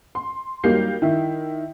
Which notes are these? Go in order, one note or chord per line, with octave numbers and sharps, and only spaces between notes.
C6
F#3 G3 A#3 D#4 G6 C7
D#3 E4